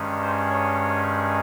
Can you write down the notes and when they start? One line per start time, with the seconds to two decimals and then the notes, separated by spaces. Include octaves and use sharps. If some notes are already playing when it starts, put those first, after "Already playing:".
Already playing: G2 D#3 G#3 C#4
0.22 C5
0.50 C#5